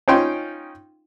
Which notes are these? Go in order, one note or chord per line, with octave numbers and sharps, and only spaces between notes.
C#4 D#4 F4 G5 C6